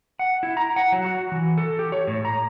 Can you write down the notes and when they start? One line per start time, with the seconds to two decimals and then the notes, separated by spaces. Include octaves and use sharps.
0.19 F#5
0.43 E4
0.57 A#5
0.76 F#5
0.92 F#3
1.05 F#4
1.32 E3
1.58 A4
1.79 G4
1.92 C#5
2.07 A2
2.25 A#5